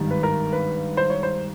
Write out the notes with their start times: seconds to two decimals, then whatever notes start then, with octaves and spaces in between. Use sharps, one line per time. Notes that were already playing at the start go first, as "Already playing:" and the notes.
Already playing: G#1 G2 D#3 G3
0.11 B4
0.23 A#4
0.53 B4
0.97 C5
1.10 C#5
1.23 C5